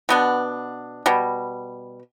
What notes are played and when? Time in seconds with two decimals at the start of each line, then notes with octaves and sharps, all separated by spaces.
0.09 B2 B3 D4
1.06 B2 G3